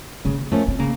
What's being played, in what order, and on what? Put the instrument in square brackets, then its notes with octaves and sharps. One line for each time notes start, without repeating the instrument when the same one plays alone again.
[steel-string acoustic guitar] C#3 [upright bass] A#3
[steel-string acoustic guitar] F3 A#3 C#4 [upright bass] A3
[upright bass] C4
[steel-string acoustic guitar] C#3 [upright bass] A#3